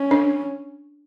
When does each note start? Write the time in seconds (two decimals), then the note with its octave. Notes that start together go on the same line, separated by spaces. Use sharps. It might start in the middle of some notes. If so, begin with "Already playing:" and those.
Already playing: C#4
0.11 D4